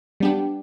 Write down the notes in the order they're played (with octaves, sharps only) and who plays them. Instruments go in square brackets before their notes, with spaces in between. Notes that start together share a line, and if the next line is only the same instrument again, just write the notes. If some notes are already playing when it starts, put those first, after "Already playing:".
[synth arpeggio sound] G3 B3 D4 G4